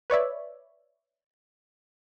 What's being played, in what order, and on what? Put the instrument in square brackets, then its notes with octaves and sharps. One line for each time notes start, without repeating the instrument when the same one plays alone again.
[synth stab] B4 C#5 D5 E5